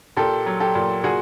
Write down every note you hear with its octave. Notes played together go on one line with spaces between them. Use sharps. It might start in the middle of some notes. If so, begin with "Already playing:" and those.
A#2 G4 A4
F#3
G4 A4
A#2
A#2 F#4 G#4